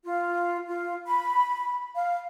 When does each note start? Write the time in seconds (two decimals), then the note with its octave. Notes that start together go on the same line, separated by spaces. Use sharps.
0.04 F4
0.67 F4
1.06 B5
1.95 F5